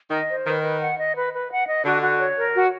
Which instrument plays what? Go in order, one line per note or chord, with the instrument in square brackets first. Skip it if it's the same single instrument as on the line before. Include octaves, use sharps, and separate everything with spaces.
[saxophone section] D#3 [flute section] D#5
[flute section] C5
[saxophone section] D#3 [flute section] B4
[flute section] B4
F#5
D#5
B4
B4
F#5
D#5
[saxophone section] D3 [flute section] F#4
[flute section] F#4
C#5
A#4
F#4